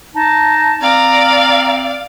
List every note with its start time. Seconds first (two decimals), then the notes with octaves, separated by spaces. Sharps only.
0.15 D#4 A5
0.81 C4 D5 F5 A#5